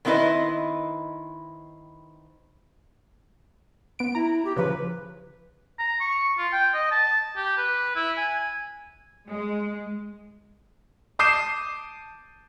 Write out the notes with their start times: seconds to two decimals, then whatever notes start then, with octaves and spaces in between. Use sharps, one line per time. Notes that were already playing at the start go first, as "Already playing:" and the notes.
0.05 D#3 B3 C4 E4 B4 D#5
3.99 B3 D7
4.15 E4 A#5
4.45 G4
4.57 C#3 F3 B4
5.79 A#5
6.01 C#6
6.38 F4
6.53 G5
6.74 D#5
6.91 A5
7.36 G4
7.57 B4
7.96 E4
8.18 G#5
9.27 G#3
11.19 A5 D6 D#6 G6 C7 E7